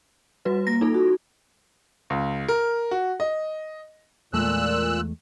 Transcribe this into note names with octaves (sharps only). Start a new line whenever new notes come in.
G3 F#4 B4
A#3 A#6
D#4 F4 A4
F#4
C#2
A#4
F#4
D#5
E2 A#2 G#3 A3 E6 F#6